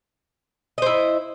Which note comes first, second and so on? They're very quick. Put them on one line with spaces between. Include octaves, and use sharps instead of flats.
D#5 C5 E4